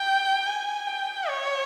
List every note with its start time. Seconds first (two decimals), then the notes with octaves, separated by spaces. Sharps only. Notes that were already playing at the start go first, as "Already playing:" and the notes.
Already playing: G5
0.47 G#5
0.87 G5
1.28 C#5